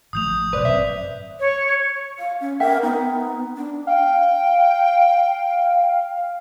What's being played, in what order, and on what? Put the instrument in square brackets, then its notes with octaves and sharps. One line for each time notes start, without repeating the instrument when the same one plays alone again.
[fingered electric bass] G#1 F3 A3 [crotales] D#6 G6 F7
[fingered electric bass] F#1 B1 B2 [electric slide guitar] B4 [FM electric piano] C5 D5
[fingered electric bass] G#1 F#2 C4 [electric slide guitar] E5
[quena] C#5
[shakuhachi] F5
C#4
[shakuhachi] A#4 [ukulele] E5 G5
[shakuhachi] B3 [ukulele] D#4
[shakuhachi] D4
[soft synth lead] F5 [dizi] G5